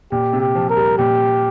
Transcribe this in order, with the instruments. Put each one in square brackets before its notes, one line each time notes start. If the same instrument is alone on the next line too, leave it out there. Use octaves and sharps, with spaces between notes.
[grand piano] A#2 [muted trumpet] G4
[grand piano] C3
[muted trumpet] G4
[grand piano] F3
[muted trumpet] A#4
[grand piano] G3
[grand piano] A#2 [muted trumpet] G4